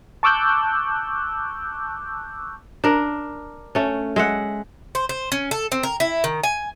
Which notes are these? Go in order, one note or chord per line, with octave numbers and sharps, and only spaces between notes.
A5 C#6 D6 E6 F#6 G6
D4 A#4
A3 C#4
G#3 E5 F#5
C5
C5
C#4
A4
C4
A#4
E4
D#3
G#5